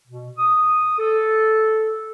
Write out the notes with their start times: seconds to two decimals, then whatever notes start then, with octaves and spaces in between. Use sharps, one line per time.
0.08 B2
0.38 D#6
0.99 A4